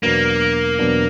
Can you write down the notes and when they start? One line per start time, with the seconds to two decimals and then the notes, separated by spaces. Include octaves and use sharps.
0.03 E2 B2 F#3 A#3 B3 D4
0.79 E2 B2 F#3 B3 D4